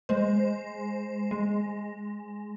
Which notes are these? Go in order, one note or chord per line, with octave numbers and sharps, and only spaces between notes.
G#3 C5
G#3